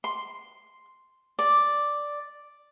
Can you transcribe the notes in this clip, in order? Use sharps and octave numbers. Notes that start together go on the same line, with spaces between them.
C6
D5